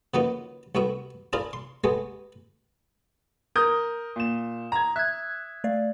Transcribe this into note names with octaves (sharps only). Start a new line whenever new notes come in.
C#3 F3 F#3 A#3 B3 D#4
C2 A3 B3 F#4 E5
D4 E4 F4 G#4 A#4 D5
C6
G#3 A3 B3 G4 G#4
A#4 D#6 G6
A#2 E7
A#5 G#6
E5 F#6 G#6
A3 D5 F5